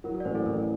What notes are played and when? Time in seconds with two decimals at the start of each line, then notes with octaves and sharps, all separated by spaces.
0.04 F#3 A#4
0.15 A#4
0.20 D5
0.25 A1 C5
0.35 A4
0.46 A1 A#4